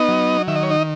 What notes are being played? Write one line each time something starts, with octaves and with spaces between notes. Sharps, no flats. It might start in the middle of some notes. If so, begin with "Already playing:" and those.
Already playing: B3 D#4 D#5
F#3
D#3 E5
D#5
C#5
D#4 D#5